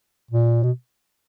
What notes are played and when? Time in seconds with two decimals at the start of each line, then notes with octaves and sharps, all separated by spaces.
0.31 A#2
0.63 B2